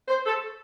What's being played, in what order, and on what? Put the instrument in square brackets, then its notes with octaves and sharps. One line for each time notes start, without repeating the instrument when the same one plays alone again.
[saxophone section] C5
A4